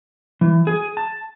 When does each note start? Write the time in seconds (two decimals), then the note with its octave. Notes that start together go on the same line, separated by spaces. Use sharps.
0.41 E3
0.67 G#4
0.97 A5